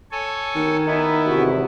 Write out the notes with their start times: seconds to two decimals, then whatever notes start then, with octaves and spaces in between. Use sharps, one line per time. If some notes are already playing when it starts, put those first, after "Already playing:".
0.11 A4 C#5 G#5
0.56 D#3
0.87 B3 D#4 E4
1.26 E2 G#2 C3 F#4